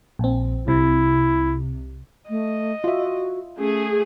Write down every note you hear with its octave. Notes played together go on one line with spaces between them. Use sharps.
A#1 C4
C2 C3 E4
A3 D#5
F4 F#4 E5
A3 C#4 G#4